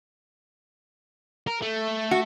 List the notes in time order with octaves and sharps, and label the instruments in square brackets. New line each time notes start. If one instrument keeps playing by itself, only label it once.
[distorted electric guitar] A#4
A3
[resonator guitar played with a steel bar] F#4